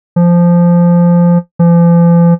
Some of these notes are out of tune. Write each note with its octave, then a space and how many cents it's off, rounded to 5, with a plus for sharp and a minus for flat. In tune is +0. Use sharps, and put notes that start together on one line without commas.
F3 -10
F3 -40